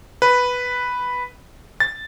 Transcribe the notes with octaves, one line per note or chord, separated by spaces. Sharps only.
B4
A6